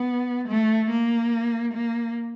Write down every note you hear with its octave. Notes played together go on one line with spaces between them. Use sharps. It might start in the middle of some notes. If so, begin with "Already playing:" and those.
Already playing: B3
A3
A#3
A#3